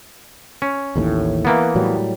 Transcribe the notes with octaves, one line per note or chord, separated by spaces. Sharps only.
C#4
A1 D#2 A2
E3 A#3 B3
A2 F#3 G3